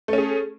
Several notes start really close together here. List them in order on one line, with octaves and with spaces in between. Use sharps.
A3 C#4 G#4